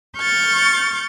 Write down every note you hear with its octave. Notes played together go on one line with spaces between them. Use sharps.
C#6 F6 G6 A6